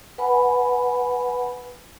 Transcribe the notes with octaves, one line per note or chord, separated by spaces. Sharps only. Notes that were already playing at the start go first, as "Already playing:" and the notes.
B4 F#5 G#5 B5